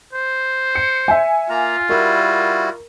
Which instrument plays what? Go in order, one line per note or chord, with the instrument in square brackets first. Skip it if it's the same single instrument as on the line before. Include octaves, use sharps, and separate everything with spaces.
[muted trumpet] C5
[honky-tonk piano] C#7
E5 G#5
[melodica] A#3 A#5 [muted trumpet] F4
[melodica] G3 E4 F#4 [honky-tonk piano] A#4